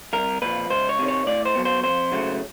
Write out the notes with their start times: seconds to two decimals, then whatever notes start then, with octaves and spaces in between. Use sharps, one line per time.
0.13 C2 A#4
0.42 A#2 F3 B4
0.70 C#2 C5
0.89 C#5
0.99 C3 D#3
1.08 C#5
1.27 A2 D5
1.45 C5
1.55 F#3 B3
1.65 C5
1.84 F2 C5
2.12 C#3 F#3 A3